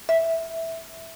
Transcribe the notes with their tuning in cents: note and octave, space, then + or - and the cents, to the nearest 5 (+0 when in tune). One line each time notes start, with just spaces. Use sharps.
E5 -5